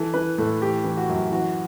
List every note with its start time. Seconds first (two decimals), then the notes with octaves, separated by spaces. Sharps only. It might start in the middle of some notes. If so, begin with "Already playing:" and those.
Already playing: E3 A4
0.14 E3 B4
0.38 A2 A4
0.61 E3 G4
0.84 E3
0.97 F#4
1.09 F#2
1.32 E3 F#4